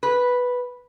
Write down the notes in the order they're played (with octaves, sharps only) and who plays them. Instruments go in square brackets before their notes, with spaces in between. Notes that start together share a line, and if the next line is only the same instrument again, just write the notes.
[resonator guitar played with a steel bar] B4